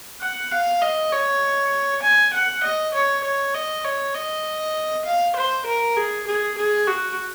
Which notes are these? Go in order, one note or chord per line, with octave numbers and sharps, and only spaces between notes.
F#5
F5
D#5
C#5
G#5
F#5
D#5
C#5
C#5
D#5
C#5
D#5
F5
C5
A#4
G#4
G#4
G#4
F#4